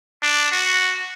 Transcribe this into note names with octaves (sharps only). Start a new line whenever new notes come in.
D4
F#4